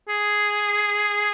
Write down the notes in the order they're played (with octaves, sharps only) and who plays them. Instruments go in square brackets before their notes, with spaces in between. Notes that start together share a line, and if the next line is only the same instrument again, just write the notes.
[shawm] G#4